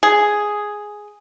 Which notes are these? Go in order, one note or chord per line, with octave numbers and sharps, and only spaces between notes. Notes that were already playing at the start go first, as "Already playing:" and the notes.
G#4